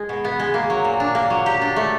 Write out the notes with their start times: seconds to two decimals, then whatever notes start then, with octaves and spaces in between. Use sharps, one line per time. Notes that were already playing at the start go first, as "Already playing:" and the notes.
Already playing: G#3
0.09 B2
0.24 B3
0.40 G#3
0.54 A#3
0.70 F#3
0.85 A#2
1.00 D4
1.15 A#3
1.30 F#3
1.46 G4
1.61 D4
1.76 A3